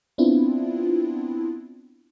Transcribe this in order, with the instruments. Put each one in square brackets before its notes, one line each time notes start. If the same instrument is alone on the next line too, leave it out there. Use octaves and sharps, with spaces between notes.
[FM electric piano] B3 C4 D4 E4 F4